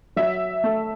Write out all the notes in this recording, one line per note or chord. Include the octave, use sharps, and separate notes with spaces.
F#3 E5
A3